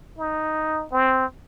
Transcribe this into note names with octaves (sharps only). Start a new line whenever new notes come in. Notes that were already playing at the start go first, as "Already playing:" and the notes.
D#4
C4